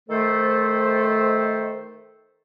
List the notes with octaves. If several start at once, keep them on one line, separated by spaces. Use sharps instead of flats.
D#3 A3 A4 C5